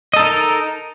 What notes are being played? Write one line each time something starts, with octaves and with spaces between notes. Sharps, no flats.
D#4 A4 A#4 D#5